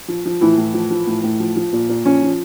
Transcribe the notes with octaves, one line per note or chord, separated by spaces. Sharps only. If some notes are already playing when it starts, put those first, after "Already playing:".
F3
F3
A2 E3 E4
A2
F3
F3
A2
A2
F3
F3
A#2
A#2
F3 C#4
F3